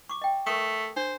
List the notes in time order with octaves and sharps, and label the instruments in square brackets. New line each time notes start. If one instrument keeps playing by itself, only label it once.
[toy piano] C#6 D6
D#5 G5
[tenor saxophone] A3 [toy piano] A#4 C#6 D#6
[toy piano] D4 [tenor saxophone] C5